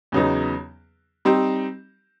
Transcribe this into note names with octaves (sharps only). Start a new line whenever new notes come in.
E2 C#3 F#3 B3 D#4
G3 C4 D#4 G4